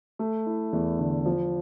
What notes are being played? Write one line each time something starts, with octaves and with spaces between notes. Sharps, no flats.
A3
E4
E2
D3
F3